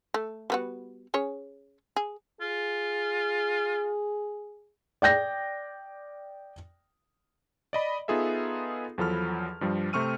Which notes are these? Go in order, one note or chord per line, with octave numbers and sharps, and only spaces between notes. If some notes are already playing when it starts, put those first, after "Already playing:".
A3
G3 B3 F#4
C#4 G#4 C#5
G#4
F4 G#4
D5 G5 G6 A#6
D5 D#5 B5
B3 D#4 F4 G#4 A4 E5
E2 F3 F#3 A4 B5 F6
G2 F3 G3
C3 A3 C4 C#6 F6 D#7